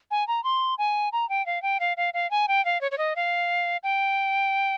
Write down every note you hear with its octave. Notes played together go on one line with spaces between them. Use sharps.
G#5
A#5
C6
G#5
A#5
G5
F5
G5
F5
F5
F5
G#5
G5
F5
C#5
C#5
D#5
F5
G5